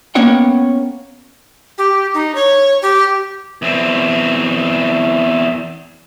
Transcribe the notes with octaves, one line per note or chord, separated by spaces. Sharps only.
A#3 B3 C#4 C#5 F#5 G5
G4
D#4
C#5
G4
E2 C4